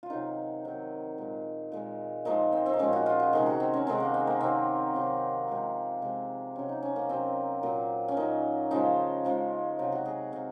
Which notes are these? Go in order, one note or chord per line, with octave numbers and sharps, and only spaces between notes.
F4
C3 D#3 F#3 D#4
C3 D#3 F#3
A#2 G#3
A#2 G#3
A#2 F3 G#3 D#4
C4
C4
D#4
A#2 F3 G#3 C#4
F#4
F4
F#4
C3 D#3 G#3 G#4
F#4
C4
C#4
C3 D#3 G#3 C4
A#3
C4
A#3
C3 D#3 F#3 C4
C3 D#3 F#3
C3 F3 G#3
C3 F3 G#3
C3 F#3 C#4
D#4
C#4
A#3
C3 F#3 C4
A#2 F#3
C#4
A#2 F#3 D#4
C#3 F3 G#3 D#4
C#3 F3 G#3
C3 F#3
F#4
G#4
C3 F5